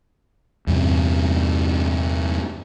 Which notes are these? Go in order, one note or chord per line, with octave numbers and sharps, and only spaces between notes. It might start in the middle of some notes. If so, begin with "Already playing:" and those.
E2 G2 C3